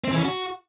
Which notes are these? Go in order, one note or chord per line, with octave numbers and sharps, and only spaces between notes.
C4
E3
C#4
F#4